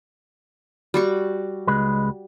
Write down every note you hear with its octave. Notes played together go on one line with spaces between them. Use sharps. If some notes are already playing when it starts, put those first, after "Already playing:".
G3 F#4 C#6
C#2 G#3 B4